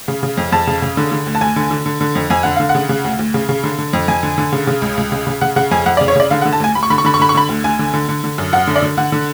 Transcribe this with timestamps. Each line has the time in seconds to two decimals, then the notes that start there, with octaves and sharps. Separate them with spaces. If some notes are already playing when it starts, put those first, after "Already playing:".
0.08 C#3
0.23 C#3
0.37 F2
0.52 F2 A5
0.67 C#3
0.82 C#3
0.97 D3
1.12 D3
1.26 D2
1.35 A5
1.41 D2 G#5
1.56 D3
1.71 D3
1.86 D3
2.01 D3
2.15 F2
2.30 F2 G#5
2.43 D3 F#5
2.56 D3 F5
2.69 F#5
2.75 C#3
2.89 C#3
3.04 D2
3.19 D2
3.34 C#3
3.49 C#3
3.64 D3
3.78 D3
3.93 F2
4.08 F2 G#5
4.23 D3
4.38 D3
4.53 C#3
4.67 C#3
4.82 C#2
4.97 C#2
5.12 C#3
5.27 C#3
5.41 C#3 F#5
5.56 C#3 F#5
5.71 F2 G#5
5.86 F2 F#5
5.97 D5
6.01 C#3
6.08 C#5
6.16 C#3 D5
6.31 D3 F5
6.42 F#5
6.45 D3
6.53 A5
6.60 D2 G#5
6.75 D2 B5
6.83 C#6
6.90 D3 B5
6.98 C#6
7.05 D3 B5
7.14 C#6
7.20 D3 B5
7.29 C#6
7.35 D3 B5
7.49 D2
7.64 D2 G#5
7.79 D3
7.93 D3
8.09 D3
8.24 D3
8.38 F#2
8.53 F#2 F#5
8.67 D3
8.76 D5
8.82 D3
8.97 D3 F#5
9.12 D3